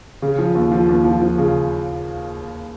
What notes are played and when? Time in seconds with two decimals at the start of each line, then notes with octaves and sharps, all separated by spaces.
0.22 C#3
0.38 F3
0.55 D#2
0.72 F3
0.89 D#2
1.04 F3
1.21 F3
1.38 C#3